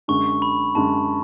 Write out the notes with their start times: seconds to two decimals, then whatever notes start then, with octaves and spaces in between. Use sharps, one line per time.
0.08 F#2 D3 G#3 C#6
0.42 B5
0.75 F#2 D3 G#3 A5